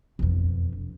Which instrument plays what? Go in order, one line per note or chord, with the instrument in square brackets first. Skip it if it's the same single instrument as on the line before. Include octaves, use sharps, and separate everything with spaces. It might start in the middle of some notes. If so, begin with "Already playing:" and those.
[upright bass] E1 F2